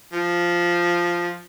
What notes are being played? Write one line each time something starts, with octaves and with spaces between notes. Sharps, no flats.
F3